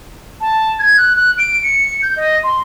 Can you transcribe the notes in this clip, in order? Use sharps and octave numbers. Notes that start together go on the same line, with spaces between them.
A5
G#6
F#6
F#6
D7
C#7
G6
D#5
C6